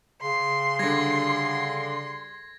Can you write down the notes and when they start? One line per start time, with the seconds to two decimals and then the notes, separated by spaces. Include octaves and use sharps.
0.22 C#3 C6
0.79 D3 G3 G#6 A#6